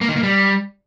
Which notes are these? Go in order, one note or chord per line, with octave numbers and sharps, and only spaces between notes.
A#3
D#3
A#3
G3